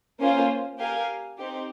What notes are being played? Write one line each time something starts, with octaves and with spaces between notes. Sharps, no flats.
A#3 C#4 F4 C5
G4 A#4 F5 G#5
C4 D#4 G4